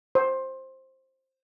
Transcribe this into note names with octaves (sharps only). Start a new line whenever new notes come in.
C5